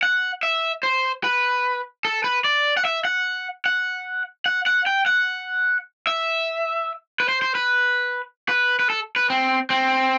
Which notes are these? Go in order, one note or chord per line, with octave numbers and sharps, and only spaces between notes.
F#5
E5
C5
B4
A4
B4
D5
F#5
E5
F#5
F#5
F#5
F#5
G5
F#5
E5
B4
C5
C5
B4
B4
B4
A4
B4
C4
C4